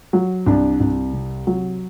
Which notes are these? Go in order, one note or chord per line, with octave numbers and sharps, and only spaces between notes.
F#3
C2 D4
C2
C3
F#3